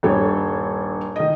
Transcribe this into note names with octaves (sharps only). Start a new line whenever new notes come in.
D#1 G2 A4 C#5
D#3 D#5